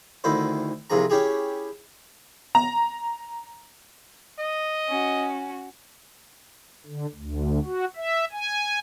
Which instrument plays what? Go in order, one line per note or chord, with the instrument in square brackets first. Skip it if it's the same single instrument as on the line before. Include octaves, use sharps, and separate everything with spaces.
[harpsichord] D2 D#3 E4 C5
C2 C3 F3 G#4 A#5
C#4 E4 G4 G#4
[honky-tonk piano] A#5
[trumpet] D#5
[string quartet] C#4 F#4
[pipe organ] D3
D2
F#4
E5
G#5